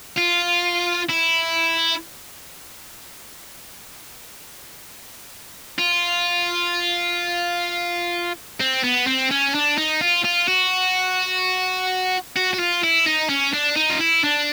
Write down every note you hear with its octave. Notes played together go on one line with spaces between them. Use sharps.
F4
E4
F4
C4
B3
C4
C#4
D4
D#4
F4
F4
F#4
F#4
F#4
F4
E4
D#4
C#4
D4
D#4
F4
E4
D4